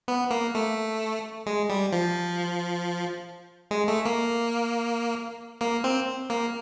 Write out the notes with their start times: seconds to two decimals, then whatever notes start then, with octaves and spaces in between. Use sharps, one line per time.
0.08 B3
0.31 A#3
0.55 A3
1.46 G#3
1.70 G3
1.92 F3
3.71 G#3
3.88 A3
4.06 A#3
5.61 A#3
5.84 C4
6.30 A#3